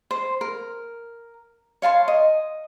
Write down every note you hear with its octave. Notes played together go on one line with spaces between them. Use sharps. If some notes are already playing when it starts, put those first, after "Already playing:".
C5
A#4
C#5 F5 A5 C6
D#5